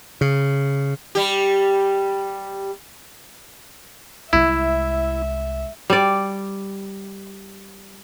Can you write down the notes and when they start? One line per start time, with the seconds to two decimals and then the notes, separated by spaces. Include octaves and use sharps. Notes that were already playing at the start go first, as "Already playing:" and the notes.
0.21 C#3
1.15 G3 G4
4.33 C2 G#3 E4 E5
5.90 G3 D5